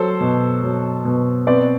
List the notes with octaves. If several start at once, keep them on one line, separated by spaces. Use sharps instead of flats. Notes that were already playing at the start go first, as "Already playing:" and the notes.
Already playing: F#3 A4 C5
B2
F#3
B2
C4 B4 D5